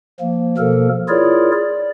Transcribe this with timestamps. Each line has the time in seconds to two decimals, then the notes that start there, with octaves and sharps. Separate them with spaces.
0.21 F3 A#3
0.58 B2 F3 A#3 A4 A#4
1.09 E4 F4 G#4 A#4 C#5 D5
1.52 D5